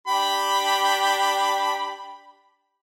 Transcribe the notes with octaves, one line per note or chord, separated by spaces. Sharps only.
D4 G4 B5